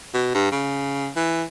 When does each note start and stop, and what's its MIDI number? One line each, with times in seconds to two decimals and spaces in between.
0.14 0.32 47
0.34 0.50 43
0.52 1.08 49
1.16 1.43 52